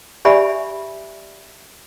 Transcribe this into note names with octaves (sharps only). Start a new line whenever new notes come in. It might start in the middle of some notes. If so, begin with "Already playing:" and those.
G4 D5 E5 G#5 B5